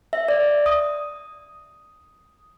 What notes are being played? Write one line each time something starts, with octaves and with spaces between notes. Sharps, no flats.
E5
D5
D#6